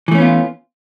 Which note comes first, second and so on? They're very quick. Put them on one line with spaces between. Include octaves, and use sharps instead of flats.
E3 A3 C#4 B3 F4